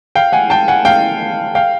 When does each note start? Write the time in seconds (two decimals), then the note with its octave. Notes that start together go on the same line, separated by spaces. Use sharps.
0.15 F5 G5
0.32 F#5 G#5
0.50 G5 A5
0.68 F#5 G#5
0.85 F5 G5
1.55 F5 G5